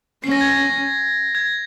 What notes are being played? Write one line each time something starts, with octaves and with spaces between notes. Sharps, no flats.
C#4 C7
A#6
G#6
A#6
G#6